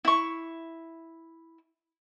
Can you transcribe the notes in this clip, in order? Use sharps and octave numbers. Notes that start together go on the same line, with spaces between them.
E4 C#6